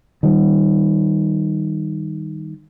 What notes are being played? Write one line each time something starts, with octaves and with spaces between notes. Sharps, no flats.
D#3 G3